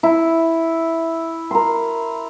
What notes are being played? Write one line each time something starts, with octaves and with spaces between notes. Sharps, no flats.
E4
A#4 C6